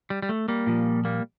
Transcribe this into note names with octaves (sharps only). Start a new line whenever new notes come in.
G3
G3
A3
G3 A#3
A#2 F3
G3 A#3